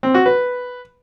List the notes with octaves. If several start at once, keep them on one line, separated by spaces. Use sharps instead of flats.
C4
F#4
B4